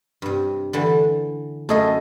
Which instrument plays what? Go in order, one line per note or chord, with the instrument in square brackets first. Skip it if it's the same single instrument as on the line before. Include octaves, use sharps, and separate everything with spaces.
[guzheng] G2 C3
D3 E3 A3
[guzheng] F#2 G#4 A4 [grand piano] A3 D#5